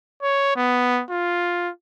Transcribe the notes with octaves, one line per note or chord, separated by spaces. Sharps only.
C#5
B3
F4